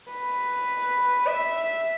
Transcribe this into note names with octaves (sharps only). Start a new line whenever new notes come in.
B4
E5